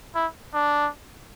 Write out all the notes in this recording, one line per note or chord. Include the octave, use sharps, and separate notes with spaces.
E4
D4